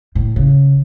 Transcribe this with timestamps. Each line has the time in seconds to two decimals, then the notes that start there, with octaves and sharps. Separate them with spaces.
0.15 A2
0.36 C#3